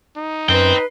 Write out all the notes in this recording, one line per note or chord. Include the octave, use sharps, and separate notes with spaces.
D#4
F#2 B4 C5 G5